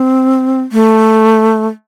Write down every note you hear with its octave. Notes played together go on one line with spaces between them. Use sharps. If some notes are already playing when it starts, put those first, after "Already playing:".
Already playing: C4
A3